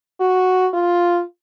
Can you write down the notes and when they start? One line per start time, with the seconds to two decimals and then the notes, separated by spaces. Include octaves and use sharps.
0.20 F#4
0.73 F4